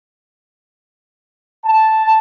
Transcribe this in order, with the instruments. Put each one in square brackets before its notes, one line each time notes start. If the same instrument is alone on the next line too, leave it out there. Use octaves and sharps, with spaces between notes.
[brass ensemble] A5